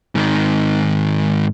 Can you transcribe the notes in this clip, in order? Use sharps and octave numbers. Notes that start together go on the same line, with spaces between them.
G#2 D#3